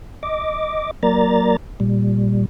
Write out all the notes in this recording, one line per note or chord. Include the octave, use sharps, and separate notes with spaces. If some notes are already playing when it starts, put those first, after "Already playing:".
D#5 D6
F#3 A#3 A#4 D5 A#5 A6
A#2 G3